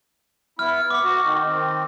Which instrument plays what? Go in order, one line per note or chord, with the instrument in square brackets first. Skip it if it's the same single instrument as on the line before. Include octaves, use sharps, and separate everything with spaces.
[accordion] B3 E4 [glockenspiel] F6
[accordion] B3 [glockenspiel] D6
[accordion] F#4
D#3
D#3 C4